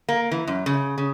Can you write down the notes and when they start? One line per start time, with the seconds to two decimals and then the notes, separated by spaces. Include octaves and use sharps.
0.09 A#3
0.31 E3
0.47 F#2
0.66 C#3
0.98 C#3